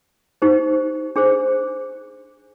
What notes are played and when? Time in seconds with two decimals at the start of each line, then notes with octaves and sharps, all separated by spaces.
0.42 D#4 G4 C5
1.16 D4 G#4 C5